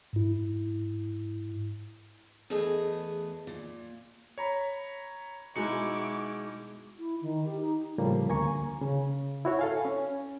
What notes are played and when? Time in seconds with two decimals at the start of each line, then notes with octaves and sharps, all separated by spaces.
0.13 G#2 E4
2.50 E2 A3 B3 G#4 D#5
3.47 A#2
4.38 C#5 A#5 B5
5.56 B2 G#3 D#4 E4 F#4 D6 C#7
6.99 E4
7.22 D#3
7.45 G4
7.61 D#4
7.98 A2 C#3 F3 G3 A#3
8.29 D2 A#3 G#5 A#5 C#6
8.81 C#3
9.45 E4 F#4 C#5
9.59 A4 F5 G#5
9.85 C#4